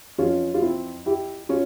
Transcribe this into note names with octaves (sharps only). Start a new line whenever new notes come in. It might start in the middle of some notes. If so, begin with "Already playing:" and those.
F2 E3 C#4 F4
F4
C4 E4
E4 G4
C#4 F4